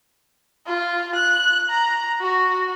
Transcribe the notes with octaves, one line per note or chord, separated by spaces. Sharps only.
F4
F#6
A#5
F#4